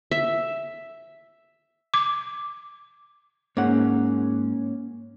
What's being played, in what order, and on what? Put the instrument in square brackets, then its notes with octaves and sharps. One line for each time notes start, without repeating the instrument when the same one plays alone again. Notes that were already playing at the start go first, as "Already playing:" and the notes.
[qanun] E5
[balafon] D6
[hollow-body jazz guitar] G#2 F#5 [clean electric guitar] A#3 C#4